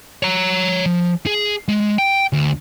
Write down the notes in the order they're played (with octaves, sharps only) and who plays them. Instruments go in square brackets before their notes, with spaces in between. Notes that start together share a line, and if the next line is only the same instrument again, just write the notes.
[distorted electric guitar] C#5 A#5
F3
G#4
G#3
G5
D2